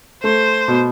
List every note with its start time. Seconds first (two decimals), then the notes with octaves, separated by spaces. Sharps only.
0.23 A3 C5
0.68 B2